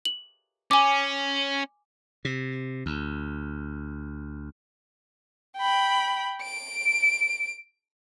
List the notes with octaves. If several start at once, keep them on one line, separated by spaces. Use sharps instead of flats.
F#7
C#4 G#5 D6
C3
D2
G5 B5
D7